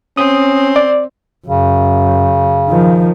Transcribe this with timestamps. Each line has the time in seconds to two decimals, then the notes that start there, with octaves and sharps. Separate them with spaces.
0.17 C4 C#4 D#6
0.76 D5
1.47 F#2 C#3
2.69 D#3 F3